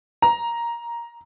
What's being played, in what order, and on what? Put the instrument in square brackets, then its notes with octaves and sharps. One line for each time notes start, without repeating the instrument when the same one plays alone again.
[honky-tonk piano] A#5